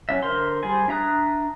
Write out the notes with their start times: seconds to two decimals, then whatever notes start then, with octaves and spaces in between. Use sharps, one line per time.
0.09 F#3 C#4 D4 E5
0.22 D3 A#4 C5 C6
0.63 G3 G#4 C5 G#5
0.88 D4 E5 A#5 D#6 F#6